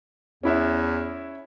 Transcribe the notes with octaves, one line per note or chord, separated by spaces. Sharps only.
E2 C#4 E4 E5